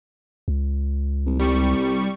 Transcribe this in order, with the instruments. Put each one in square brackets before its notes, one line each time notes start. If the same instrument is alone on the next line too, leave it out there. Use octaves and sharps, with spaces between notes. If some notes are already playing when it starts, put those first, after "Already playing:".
[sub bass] C#2
[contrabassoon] C2
[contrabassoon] C2 [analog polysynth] G3 C#6